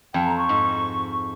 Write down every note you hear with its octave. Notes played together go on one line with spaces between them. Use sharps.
F2 G5
A#5
C#6
G#2